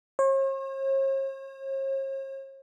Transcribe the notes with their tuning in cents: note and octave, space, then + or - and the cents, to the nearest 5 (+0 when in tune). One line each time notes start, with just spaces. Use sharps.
C#5 -45